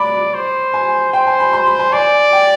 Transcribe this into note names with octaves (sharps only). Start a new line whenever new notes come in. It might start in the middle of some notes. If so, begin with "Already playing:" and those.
Already playing: D5 B5 D6
C5
G#5
C5 G5
G#5
B5
C6
B5
G#5
D5 G#5
G5